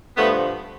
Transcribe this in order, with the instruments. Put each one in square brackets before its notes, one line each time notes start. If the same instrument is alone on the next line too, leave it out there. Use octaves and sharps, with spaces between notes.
[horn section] G2 D3 F3 A3 B3